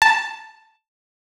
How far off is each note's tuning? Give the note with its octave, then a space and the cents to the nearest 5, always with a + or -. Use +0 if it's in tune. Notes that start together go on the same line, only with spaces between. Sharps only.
A5 +5